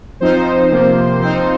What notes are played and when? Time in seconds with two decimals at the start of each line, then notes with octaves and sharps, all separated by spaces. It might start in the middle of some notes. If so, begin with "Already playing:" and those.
0.20 F3 C4 D#4 C5
0.71 C3 F3 A#3
1.20 F3 C4 D#4 C5